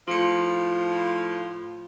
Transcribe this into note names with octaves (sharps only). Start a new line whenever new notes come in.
A2 F3 F4 C#7